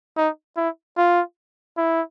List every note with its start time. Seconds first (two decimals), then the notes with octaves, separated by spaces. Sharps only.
0.17 D#4
0.57 E4
0.97 F4
1.77 E4